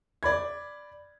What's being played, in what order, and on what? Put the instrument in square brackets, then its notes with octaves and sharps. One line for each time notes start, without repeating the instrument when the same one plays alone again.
[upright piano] D5 B5 G#6